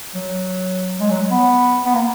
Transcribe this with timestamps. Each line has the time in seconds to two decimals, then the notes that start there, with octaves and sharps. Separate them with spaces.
0.15 F#3
1.00 G#3
1.10 F#3
1.31 B3
1.85 B3
1.95 A#3